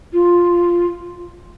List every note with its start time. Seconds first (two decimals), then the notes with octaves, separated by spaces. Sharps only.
0.13 F4